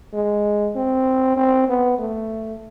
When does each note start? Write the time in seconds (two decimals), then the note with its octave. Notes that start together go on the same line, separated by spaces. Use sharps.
0.13 G#3
0.76 C4
1.37 C4
1.69 B3
1.99 A3